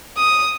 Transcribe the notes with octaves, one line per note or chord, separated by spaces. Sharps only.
D#6